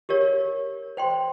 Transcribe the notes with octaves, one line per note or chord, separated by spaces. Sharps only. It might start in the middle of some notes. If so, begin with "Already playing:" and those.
G4 A#4 C#5
C5 G5 C6